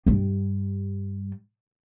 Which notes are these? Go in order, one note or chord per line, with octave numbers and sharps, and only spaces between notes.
G2 G3